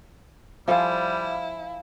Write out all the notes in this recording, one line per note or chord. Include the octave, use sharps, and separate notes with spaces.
F3 G3 E4 F4 A4 F5 G#5 A5